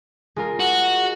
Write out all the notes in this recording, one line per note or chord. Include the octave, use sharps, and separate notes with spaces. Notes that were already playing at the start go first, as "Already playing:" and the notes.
G#3 F4 A#4
F#4